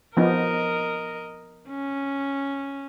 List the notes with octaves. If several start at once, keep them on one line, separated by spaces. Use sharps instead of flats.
F3 B3 D#4 A#4 D#5
C#4